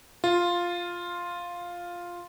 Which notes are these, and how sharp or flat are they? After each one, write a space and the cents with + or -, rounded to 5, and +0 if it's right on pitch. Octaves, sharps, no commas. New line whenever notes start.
F4 +0